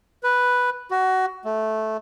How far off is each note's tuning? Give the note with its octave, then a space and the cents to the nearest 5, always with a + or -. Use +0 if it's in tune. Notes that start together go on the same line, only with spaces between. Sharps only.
B4 +0
F#4 +20
A3 -10